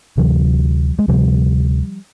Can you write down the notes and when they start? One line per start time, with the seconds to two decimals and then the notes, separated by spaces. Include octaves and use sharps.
0.17 D2 C3 E3 F#3
0.99 G#3
1.08 D2 C3 F3 G3